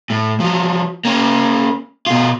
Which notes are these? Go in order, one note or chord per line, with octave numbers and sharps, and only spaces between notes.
A2
F3 F#3
A#3 C#4
B2 F4